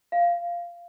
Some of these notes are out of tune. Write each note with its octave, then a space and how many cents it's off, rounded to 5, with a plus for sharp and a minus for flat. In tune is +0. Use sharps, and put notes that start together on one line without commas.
F5 -10